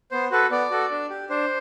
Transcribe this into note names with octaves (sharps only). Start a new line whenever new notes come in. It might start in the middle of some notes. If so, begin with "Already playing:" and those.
B3 C5
F#4 A4 B4
B3 D5
F#4 A4
D4
G4
D4 C5